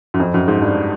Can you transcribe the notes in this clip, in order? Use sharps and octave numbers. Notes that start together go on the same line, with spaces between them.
F#2
F2
F#2
G#2
G2